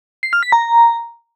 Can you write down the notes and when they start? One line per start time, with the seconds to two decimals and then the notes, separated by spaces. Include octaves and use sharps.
0.23 C7
0.33 F6
0.43 B6
0.52 A#5